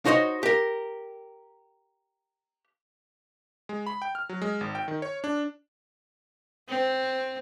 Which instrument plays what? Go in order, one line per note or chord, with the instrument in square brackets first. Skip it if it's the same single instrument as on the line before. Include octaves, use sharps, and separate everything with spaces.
[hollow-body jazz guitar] D#4 F#4 C5 C#5 D#5
G4 A#4
[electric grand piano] G#3
B5
G5
F6
F#3
G#3
G#1
G5
D#3
C#5
D4
[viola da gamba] C4